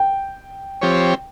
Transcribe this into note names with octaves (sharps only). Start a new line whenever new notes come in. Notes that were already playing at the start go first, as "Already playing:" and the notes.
Already playing: G5
F3 C4 G4 C#5